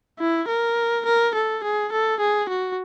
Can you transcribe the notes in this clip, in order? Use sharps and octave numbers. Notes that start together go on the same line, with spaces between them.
E4
A#4
A#4
A4
G#4
A4
G#4
F#4